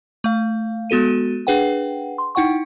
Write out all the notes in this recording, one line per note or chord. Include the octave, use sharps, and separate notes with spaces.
A3 F5
G#3 B3 F#4 A4 D#7
D4 G#4 B4 F#5 G5
C6
D#4 E4 F#5 G5 C#6